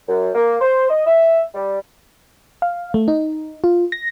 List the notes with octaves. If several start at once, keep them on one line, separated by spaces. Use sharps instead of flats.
F#2
A#3
C5
D#5
E5
G3
F5
A3
D#4
F4
A#6